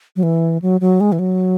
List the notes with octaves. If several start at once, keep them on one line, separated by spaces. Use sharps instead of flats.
F#3
E3
F#3
F#3
G#3
E3
F#3